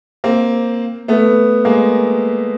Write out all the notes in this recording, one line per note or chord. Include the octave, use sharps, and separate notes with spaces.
A#3 C4
A3 B3
G#3 A#3